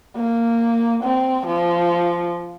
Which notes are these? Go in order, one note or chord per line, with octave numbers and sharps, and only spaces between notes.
A#3
C4
F3